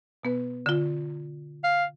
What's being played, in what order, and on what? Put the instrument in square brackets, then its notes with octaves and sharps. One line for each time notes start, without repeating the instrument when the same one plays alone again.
[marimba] B2 B3 B4
D3 F4
[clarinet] F5